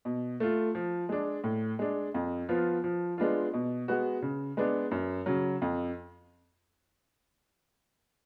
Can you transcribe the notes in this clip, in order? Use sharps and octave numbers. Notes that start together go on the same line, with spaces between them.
B2
A3 F4
F3
G#3 D4
A2
G#3 D4
F2
F3 B3 F4
F3
G#3 B3 D4 F4
B2
G#3 B3 F#4
C#3
G#3 B3 D4
F#2
C#3 F#3
F2